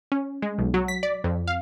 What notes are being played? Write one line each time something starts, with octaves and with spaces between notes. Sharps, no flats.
C#4
G#3
B1
F#3
B6
D5
F2
F5